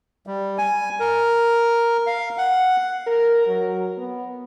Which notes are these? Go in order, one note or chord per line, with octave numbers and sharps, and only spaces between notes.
G3
G#5
A#4
F5
F#5
A#4
F#3
B3